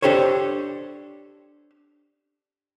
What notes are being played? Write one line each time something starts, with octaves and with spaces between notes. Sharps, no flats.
D4 G4 A4 C5 C#5